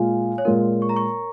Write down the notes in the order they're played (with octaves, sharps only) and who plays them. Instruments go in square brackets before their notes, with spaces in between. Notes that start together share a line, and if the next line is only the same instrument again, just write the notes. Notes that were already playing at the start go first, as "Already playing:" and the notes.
Already playing: [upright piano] A#2 G#3 F4 [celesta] F5 G#5
[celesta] C#5
[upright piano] A#2 G#3 F4 [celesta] A#4
[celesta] C#6
A#5
C#6